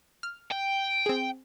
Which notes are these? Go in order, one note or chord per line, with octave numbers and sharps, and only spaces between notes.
F6
G5
C4 G#4